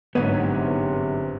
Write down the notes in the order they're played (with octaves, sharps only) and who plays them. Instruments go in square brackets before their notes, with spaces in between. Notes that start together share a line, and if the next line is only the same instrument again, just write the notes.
[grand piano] G1 G#6 D#7 [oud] G#2 F#3 D#4 [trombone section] C3 [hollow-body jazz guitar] B3